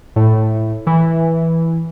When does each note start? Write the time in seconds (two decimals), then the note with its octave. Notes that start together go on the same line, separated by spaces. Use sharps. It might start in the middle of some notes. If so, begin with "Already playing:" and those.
0.16 A2
0.87 E3